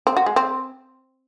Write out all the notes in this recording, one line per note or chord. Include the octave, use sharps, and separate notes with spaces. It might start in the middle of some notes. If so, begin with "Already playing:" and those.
C4
F#4
G#3
C4